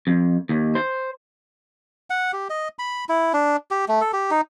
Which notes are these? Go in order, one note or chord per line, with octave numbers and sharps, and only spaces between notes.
F2
D#2
C5
F#5
G4
D#5
B5
E4
D4
G4
A3
A4
G4
D#4